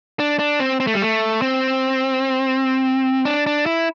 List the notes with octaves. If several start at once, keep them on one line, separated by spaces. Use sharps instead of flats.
D4
D4
C4
C4
A3
G3
A3
C4
D4
D4
E4